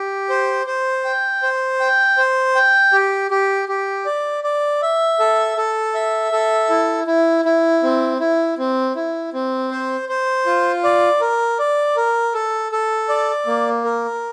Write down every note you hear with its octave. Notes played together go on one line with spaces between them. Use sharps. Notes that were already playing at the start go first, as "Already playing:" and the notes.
Already playing: G4
C5
C5
G5
C5
G5
C5
G5
G4
G4
G4
D5
D5
E5
A4
A4
E5
A4
E4
E4
E4
C4
E4
C4
E4
C4
C5
C5
F4
D5
A#4
D5
A#4
A4
A4
D5
A#3
A#4